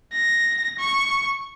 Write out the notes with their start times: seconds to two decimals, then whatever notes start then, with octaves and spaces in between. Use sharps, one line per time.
0.13 A#6
0.79 C#6